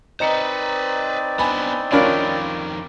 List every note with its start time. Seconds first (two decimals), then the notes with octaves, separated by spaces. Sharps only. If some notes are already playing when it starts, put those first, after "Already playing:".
0.20 C4 D#4 B4 C5 D5 D#5 A#5 C#7
1.39 B3 D4 G#5 B5
1.92 F2 D#3 C#4 D4 F4 A#4 B5